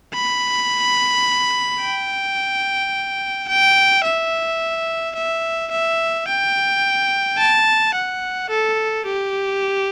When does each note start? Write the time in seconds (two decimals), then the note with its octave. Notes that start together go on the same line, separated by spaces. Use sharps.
0.14 B5
1.82 G5
3.49 G5
4.04 E5
5.15 E5
5.71 E5
6.28 G5
7.38 A5
7.95 F#5
8.50 A4
9.06 G4